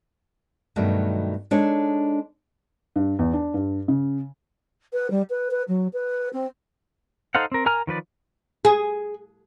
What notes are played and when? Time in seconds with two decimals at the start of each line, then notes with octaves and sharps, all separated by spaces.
0.76 G2 B2 D#3 F#3 A3
1.51 G#3 D4 D#4 A4 C#5
2.96 G2
3.19 E2
3.33 D4
3.54 G2
3.88 C#3
4.93 B4
5.10 G3
5.30 B4
5.51 B4
5.68 F#3
5.93 B4
6.33 C4
7.35 D#4 A4 C5 F5 F#5
7.52 C4 A#4
7.66 A#4 G#5 A#5 F6
7.87 D#3 F3 B4 D5
8.65 G#4